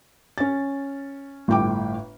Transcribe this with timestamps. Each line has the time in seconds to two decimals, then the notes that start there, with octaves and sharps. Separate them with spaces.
0.38 C#4 A6
1.48 G1 A2 G5 D6